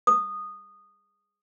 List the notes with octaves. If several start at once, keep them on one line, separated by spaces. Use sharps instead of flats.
D#6